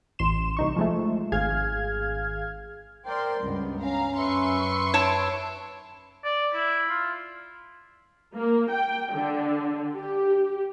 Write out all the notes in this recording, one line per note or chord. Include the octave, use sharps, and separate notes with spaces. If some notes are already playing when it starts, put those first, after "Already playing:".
A1 C6 E7
C2 D#4 C#6
F3 G#3 A3
G#1 G#4 F5 F6 G#6
A#4 C5 D5 G5 C6
C#2 G2 B3
C#4 F5 A#5
F#2 B4 E5 C6 C#6
C#5 A5 D7
D5
E4
F4
A#3
G5
D3
G4